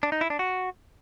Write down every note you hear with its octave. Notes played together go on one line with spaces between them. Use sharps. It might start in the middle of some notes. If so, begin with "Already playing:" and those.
D4
D#4
E4
D4
F#4